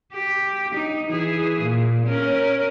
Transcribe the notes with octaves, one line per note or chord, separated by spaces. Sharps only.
G4
D#4
E3 G#4
A#2
C#4 A#4